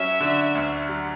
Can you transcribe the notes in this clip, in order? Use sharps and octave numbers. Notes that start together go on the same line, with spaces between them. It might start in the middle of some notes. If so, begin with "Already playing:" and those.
Already playing: F#3 C#4 E5
D3
D2
F#3